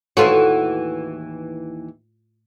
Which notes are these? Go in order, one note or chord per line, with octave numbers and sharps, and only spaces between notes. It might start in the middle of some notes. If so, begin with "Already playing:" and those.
D#2 A2 E3 A3 F4 F#4